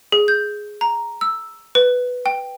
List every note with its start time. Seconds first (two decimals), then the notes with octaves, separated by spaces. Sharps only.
0.12 G#4
0.28 G6
0.81 A#5
1.21 E6
1.75 B4
2.26 G5